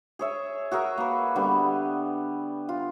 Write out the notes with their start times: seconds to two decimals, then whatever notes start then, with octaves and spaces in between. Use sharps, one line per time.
0.19 G#4 C#5 E5
0.71 F#4 G#4 A#4 E5
0.98 A#3 B4
1.35 D3 G3 B3
2.69 F4